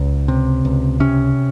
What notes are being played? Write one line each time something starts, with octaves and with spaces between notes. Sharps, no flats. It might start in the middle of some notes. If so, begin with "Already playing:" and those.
Already playing: C#2
C3
C#2
C3 C#4